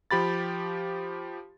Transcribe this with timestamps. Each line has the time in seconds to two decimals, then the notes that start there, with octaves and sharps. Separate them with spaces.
0.11 F3 G4 B5 A6